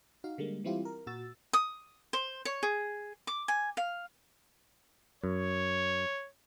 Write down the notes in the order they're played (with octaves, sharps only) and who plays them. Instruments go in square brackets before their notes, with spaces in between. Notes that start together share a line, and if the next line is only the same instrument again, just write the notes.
[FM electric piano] D#4 F#4 F5
D3 G3 G#3 A#3
E3 G3 C4 E4 F4 G4
A#4
A#2 F#4 E6 A6
[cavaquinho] D#6
C5
C#5
G#4
D6
G#5
F5
[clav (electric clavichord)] F#2 [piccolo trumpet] C#5